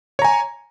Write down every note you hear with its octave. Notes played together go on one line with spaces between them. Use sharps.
C#5 G#5 A#5